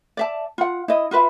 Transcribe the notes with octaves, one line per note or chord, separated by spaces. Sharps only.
D5 E5 A5
F4 F#5
E4 D#5
F4 F#4 B4 E5